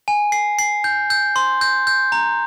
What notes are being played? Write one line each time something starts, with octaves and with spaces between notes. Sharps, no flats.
G#5
C7
C7
G6
G6
C6
G6
G6
A#5